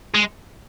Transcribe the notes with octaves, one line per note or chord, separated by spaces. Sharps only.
G#3